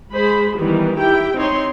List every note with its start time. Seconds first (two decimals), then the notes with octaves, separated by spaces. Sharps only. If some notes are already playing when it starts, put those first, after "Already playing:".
0.13 G#3 G#4 C5 B5
0.58 D#3 E3 G3 B3
0.99 E4 G4 G5
1.36 C4 D#4 C#5 C6